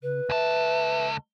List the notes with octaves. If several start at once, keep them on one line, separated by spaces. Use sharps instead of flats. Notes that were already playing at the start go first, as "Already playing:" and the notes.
C#3 B4
C#2 A4 E5